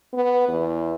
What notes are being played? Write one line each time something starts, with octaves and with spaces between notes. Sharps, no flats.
B3
E2